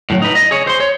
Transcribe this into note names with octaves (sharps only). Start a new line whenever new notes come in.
A2 F#3
D#4 B4
D#5
G#4 C#5
C5 C6
C#5